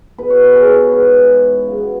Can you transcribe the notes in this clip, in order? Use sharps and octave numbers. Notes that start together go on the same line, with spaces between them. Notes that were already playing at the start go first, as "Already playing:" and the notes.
B2 B3 B4
C#5
B4
G#4
B4
C#5
G#2 E3 G#3 B4
C#3 F#3 B3